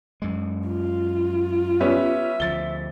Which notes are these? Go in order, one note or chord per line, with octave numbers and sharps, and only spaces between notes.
F#2 G#3
F4
G3 B3 C#4 E5
D2 F3 A6 G7